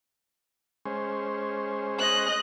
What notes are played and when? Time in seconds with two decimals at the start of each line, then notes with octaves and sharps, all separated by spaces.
0.85 G#3 C#4 C5
1.99 D#5 F#6